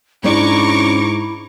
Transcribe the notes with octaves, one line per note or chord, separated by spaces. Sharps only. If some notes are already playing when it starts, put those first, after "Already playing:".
G#2 C#4 D4 E4 D5 A#5 C#6 D6